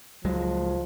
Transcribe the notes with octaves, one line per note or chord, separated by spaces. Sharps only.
C#2 F3 F#3 G#3